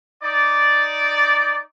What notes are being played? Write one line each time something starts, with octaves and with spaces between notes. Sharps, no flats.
D#4 D5